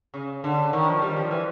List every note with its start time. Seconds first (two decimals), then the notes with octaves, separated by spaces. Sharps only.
0.14 C#3
0.44 D3
0.73 D#3
0.88 F3
1.02 G3
1.17 F3
1.31 E3